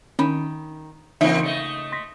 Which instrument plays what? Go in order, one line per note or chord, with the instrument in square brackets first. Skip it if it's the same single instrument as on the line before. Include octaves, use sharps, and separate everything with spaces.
[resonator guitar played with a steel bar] D#3 [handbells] C#4 B5
[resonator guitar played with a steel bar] C#3 D#4 [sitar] E3 A#3 C4 [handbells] E5
[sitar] A3 D#5 [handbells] C#7
[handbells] C6 A#6 B6